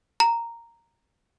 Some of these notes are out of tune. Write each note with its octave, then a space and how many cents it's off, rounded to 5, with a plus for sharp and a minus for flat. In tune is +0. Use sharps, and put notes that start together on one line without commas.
A#5 -5